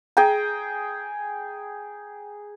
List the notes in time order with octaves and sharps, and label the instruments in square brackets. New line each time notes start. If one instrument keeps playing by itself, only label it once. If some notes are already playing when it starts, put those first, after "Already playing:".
[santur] G#4 G5 A#5